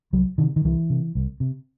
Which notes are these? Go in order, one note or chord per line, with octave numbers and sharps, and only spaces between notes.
C2 F#3
C3 D#3
D#3
C2 E3
C3
C2
C3